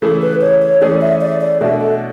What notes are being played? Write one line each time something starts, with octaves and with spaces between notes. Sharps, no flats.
C#3 E3 A3 E4 G#4 A4
B4
C#5
C#5
E3 A3 C#4 G#4 D5
E5
D5
D5
B2 A3 D4 F#4 E5
A4